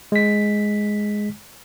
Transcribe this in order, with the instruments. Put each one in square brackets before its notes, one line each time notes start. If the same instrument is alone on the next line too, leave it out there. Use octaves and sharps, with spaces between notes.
[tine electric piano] G#3 B6